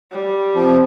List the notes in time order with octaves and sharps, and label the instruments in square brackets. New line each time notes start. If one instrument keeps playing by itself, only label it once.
[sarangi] G3
[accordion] F3 [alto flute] C4